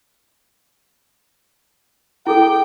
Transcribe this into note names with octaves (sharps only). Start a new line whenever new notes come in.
E4 G#4 A4 G5